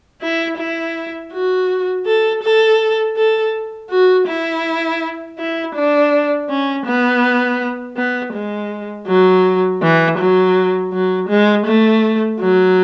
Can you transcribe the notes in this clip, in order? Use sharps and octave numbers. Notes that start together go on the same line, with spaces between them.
E4
E4
F#4
A4
A4
A4
F#4
E4
E4
D4
C#4
B3
B3
G#3
F#3
E3
F#3
F#3
G#3
A3
F#3